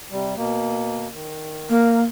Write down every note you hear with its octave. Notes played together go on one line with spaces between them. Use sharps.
C3 G3
B2 A#3
D#3
A#3 A#4